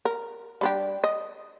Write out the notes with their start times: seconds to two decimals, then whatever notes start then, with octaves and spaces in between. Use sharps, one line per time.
0.05 A#4
0.61 G3 D4 G4
1.04 D#5